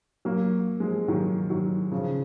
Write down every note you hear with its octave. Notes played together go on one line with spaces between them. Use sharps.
F#3 A#3
F3 G#3
D#3 F#3
D#3 F#3
C#3 F3